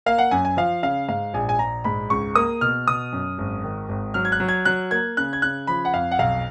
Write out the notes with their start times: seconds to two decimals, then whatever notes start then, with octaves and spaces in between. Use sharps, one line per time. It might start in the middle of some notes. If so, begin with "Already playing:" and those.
0.06 A#3 F5
0.18 F#5
0.31 F#2 G#5
0.45 G#5
0.57 F3 F5
0.83 C#3 F5
1.08 G#2 F5
1.34 A#1 G#5
1.49 G#5
1.59 A#1 A#5
1.84 G#2 B5
2.10 C#2 C#6
2.35 A#3 D#6
2.61 B2 F6
2.88 B2 D#6
3.12 F#2
3.38 G#1
3.64 D#3
3.89 G#1
4.14 F#3 F6
4.25 G#6
4.32 F#6
4.40 F#3
4.48 G#6
4.65 F#3 F#6
4.91 A#3 G#6
5.17 C#3 F#6
5.33 G#6
5.42 C#3 F#6
5.67 F3 B5
5.85 F#5
5.94 F2 F5
6.11 F#5
6.19 B1 F5